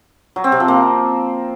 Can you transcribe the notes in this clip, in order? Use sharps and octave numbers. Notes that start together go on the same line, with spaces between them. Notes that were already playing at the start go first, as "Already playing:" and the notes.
F#3
C4
C3
F3
A#3